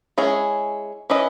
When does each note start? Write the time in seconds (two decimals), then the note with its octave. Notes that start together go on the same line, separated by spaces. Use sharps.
0.18 G#3 C#4 E4 G#4
1.10 C#4 E4 B4 D#5